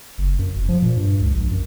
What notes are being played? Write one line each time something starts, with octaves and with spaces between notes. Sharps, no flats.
F#1
F#2
F1
F3
A#2
G2
C#2
A#1
F#2